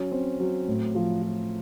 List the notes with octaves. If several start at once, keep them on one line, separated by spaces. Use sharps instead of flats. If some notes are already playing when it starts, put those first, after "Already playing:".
Already playing: F#3 C#4
C4
F#3
A2
F3
F4